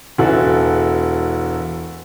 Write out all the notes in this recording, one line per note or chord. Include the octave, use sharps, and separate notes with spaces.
E1 E3 F#4 A4